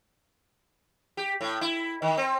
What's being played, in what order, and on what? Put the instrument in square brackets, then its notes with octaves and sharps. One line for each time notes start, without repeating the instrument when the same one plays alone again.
[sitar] G4
A2
E4
D#3
C4